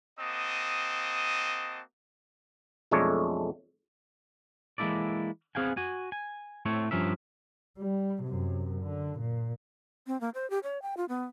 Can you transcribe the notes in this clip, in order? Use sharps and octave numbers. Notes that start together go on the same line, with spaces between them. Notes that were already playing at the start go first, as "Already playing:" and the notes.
A#3 C4 F#4 D#5 A5 D#6
B1 F2 G#3 A3 D4 C#5
E3 G#3 A#3 E4 A4 D5
B3 C4 G#4 F5 G5 G#5
F#4 G#5
G#5
A2 A3 C4 C#5
G2 F3 C#4 A#4 E5
G3
F#2 C3
D3
A#2
C4
A#3
C5
G4
C#5
G5
F4
B3